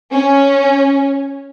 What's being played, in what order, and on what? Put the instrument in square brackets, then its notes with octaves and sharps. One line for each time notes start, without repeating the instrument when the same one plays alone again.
[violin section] C#4